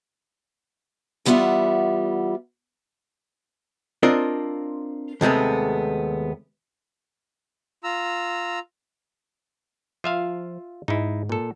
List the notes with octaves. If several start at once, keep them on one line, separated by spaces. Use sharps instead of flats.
E2 G3 B3 F4 E5 F#5
C4 D4 F4 A#4 D#5
D#2 C3 G#3 A3 B3
F4 A#5 E6
F3 F4 E5 F5
G#2 D#4 E4
A#2 A4